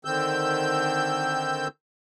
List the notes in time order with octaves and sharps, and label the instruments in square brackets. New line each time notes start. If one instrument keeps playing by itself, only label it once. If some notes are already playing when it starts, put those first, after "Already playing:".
[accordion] D3 D#3 C4 E6 G6